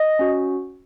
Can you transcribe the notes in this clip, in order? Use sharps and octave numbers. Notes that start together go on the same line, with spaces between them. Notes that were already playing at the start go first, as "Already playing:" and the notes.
Already playing: D#5
C#4 F#4